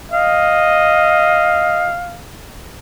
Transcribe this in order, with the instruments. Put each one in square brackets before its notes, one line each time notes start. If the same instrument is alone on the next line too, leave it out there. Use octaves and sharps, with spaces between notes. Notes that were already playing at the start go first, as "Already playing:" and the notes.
[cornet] D#5 [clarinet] F5